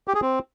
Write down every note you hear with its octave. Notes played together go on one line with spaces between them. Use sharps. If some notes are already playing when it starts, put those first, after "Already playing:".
G4
G#4
C4